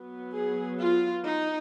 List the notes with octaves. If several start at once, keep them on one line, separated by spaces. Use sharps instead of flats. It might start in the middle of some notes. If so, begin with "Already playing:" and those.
Already playing: F#3 B3
G#4
F4
D#4